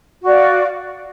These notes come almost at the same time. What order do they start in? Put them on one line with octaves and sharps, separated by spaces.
F#4 D5 F5